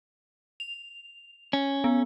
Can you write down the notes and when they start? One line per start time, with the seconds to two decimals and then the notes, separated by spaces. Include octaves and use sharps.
0.60 F7
1.53 C#4
1.84 B3